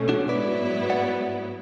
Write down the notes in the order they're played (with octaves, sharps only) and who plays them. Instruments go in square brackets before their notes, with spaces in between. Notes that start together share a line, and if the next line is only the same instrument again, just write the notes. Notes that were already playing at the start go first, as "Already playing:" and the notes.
Already playing: [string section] B2 A3 C#4
[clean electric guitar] D4 F#4
[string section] G#2 F#3 B3 E4 [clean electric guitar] B4 D5
[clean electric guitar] D5 F#5